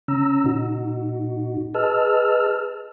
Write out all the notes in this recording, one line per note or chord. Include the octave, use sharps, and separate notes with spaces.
C#3 C#4 A#5 E6
A#2 D#4 F#4
G#4 B4 D#5 A5 E6 F6